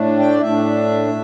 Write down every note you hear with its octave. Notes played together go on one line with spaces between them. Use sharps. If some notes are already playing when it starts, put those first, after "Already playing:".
Already playing: A2 A3 D4
G5
D5
A2 A3 D4 E5